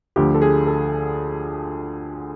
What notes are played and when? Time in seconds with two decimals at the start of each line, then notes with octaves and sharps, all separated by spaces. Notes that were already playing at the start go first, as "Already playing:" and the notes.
0.16 D2 D3 F3 G4
0.35 A4
0.42 G#4
0.67 A4